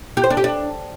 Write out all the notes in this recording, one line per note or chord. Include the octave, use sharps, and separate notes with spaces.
G4
C5
D4
G4
D4